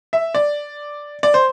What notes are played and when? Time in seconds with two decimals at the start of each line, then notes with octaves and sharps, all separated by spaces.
0.13 E5
0.35 D5
1.23 D5
1.34 C5